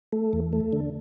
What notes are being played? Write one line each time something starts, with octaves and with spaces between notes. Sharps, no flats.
A3
E2
A3
D3